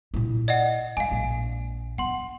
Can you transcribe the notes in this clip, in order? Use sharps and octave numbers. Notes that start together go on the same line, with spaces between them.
A#2 E4
D5 D#5 F#5
G#3 F5 G#5
A#1
B3 F#5 C6